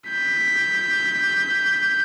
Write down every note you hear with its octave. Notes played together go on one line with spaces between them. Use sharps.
G6 B6